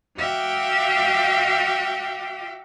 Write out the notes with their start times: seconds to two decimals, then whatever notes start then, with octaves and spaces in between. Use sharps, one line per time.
0.16 F#4 E5 F5 G5 D6